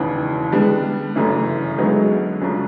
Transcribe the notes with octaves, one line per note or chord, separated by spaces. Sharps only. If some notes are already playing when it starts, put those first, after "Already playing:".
Already playing: E1 D#2 C#3 E3
D3 G3 G#3 B3 D4
G1 F#2 C#3 E3 A3
D2 D3 F#3 G#3 B3 D#4
F#2 C#3 F3 A3 D4